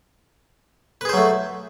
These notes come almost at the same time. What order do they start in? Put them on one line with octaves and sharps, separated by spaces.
B4 G#4 C5 F#3 A3